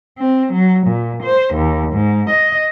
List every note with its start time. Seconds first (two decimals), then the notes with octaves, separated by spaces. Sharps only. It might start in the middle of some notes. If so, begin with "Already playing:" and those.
0.18 C4
0.53 F#3
0.87 A#2
1.23 C5
1.55 D#2
1.93 G#2
2.30 D#5